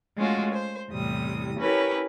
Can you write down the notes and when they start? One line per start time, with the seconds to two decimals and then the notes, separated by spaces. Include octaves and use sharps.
0.18 G#3 A3 C#4 F4 F#4
0.52 C5
0.92 E2 A2 C3 G3 D#6
1.58 C#4 E4 G4 A#4 B4 C#5